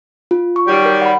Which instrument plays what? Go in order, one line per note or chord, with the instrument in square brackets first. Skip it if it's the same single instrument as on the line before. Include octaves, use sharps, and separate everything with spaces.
[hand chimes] F4
C#6
[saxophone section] D#3 F#3 G3
[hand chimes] A#4
F#5 B5